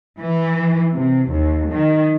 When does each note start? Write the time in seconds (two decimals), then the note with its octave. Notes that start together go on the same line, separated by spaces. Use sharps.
0.19 E3
0.93 C3
1.29 D#2
1.69 D#3